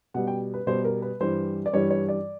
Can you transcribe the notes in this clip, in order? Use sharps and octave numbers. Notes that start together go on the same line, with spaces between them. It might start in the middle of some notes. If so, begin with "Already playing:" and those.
B2 G3 F#5
G5
B4
B2 G3 C5
A#4
B4
G2 E3 G3 C5
D5
G2 E3 G3 C#5
C#5
D5